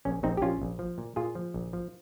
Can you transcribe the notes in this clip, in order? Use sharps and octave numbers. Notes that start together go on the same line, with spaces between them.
A#1 C#4
A#1 C4 D#4
G4
A#1 C#4 F4
A#1
F3
A#2
A#2 F4 G#4
F3
A#1
F3